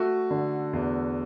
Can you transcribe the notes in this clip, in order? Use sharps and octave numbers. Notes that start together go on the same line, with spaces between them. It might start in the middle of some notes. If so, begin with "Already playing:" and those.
Already playing: A3 F#4
D3
E2